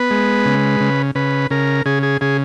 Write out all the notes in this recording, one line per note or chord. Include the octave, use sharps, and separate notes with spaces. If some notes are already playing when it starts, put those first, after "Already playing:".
Already playing: B3 B4
G#3
C#3
C#3
C#3 B4
C#3 A#4
C#3 G#4
G#4
C#3 G#4